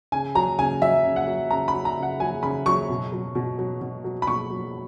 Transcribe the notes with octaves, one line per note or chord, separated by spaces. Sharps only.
C#3 G#5
F#3 A#5
C#3 G#5
F#3 E5
C#3
F#5
F#3
C#3 A#5
B5
F#3
A#5
C#3
F#5
F#3 G#5
C#3 B5
F#3 C#6
B2
F#3
B2
F#3
B2
F#3
B5
B2 C#6
F#3